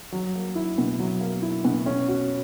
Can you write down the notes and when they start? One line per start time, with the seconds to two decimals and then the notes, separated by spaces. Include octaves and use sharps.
0.12 F#3
0.35 A#3
0.55 E4
0.78 B2
1.00 F#3
1.20 A#3
1.42 E4
1.65 B2
1.86 C#4
2.08 F#4